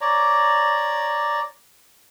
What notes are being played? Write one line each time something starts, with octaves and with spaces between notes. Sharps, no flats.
C#5 D5 A#5